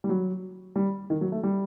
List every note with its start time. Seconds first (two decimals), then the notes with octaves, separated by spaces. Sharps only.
0.04 G3
0.09 F#3
0.76 G3
1.10 D#3
1.21 F#3
1.32 A3
1.44 G3